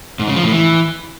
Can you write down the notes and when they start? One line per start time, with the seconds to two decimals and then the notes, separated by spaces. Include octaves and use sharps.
0.19 G#2
0.27 C#3
0.35 F3
0.44 A2
0.52 E3